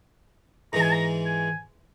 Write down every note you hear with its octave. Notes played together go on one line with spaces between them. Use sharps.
G#2 E3 G#3 A#5
G#5
A#5
G#5